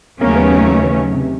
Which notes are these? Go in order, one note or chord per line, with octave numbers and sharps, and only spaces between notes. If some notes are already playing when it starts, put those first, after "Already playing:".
D#2 C#3 F#3 A3 A#3 C#4
B3
A#3
E3
E3
C3